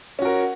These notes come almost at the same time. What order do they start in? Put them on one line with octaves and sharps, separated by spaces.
C#4 F#4 A#4